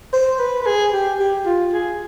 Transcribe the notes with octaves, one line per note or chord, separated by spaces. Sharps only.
C5
B4
B4
G#4
G4
G4
F4
G#4